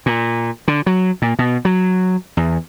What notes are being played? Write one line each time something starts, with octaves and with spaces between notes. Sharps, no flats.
A#2
D3
F#3
A#2
B2
F#3
E2